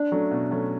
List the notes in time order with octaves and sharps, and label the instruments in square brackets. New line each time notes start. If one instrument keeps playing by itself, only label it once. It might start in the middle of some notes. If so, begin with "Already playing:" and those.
Already playing: [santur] D4
[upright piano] F#3 A3 C#4
B2
F#3 A3 C#4